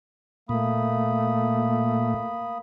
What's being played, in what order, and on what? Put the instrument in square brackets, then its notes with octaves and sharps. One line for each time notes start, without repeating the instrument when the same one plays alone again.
[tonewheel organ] A#2 [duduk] A3 [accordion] A#3 B5 D#6